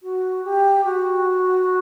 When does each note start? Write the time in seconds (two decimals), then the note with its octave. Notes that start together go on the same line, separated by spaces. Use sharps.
0.03 F#4
0.44 G4
0.85 F#4